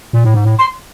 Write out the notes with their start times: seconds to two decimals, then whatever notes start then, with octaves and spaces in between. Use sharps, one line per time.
0.13 A#2
0.24 A2
0.34 G#2
0.45 A2
0.59 C6